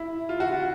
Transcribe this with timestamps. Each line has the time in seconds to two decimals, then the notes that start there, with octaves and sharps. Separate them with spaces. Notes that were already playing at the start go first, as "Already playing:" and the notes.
Already playing: E4
0.29 F4
0.40 F#4
0.52 F4